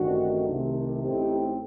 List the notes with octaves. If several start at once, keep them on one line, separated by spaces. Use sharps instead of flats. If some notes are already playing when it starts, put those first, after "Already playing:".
Already playing: A1 G2 D#3 A3 C4 D4 F#4
C2 C3 D#3 A3
A1 A2 A3 C4 D#4 G4